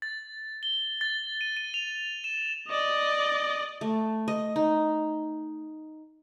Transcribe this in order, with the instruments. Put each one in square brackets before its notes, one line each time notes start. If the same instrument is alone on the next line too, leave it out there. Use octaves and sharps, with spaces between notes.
[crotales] A6
G7
A6
D#7
D#7
F7
E7
[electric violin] D5 D#5
[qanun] A3
D#5
D#4